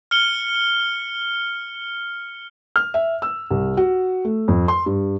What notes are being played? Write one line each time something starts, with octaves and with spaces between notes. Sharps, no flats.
F6 C#7 G7
F6
E5
E6
C2
F#4
A3
F2
C6
G2